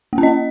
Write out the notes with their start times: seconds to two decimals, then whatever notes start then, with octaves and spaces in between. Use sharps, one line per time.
0.13 A#3
0.18 C#4
0.23 D#5